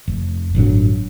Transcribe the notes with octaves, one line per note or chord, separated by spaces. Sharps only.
F1
G1 A2 F#3 D4